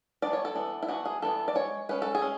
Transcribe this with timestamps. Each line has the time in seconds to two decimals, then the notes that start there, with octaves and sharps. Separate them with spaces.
0.22 E3 B3 D4 D5
0.33 C#5
0.45 A4
0.55 E3 B3 D4
0.83 E4
0.88 E3 B3 D4 F#4
1.05 G#4
1.22 E3 B3 D4 A4
1.48 D5
1.55 G#3 C#4 C#5
1.89 G#3 C#4 B4
2.02 A4
2.15 G#4
2.22 G#3 C#4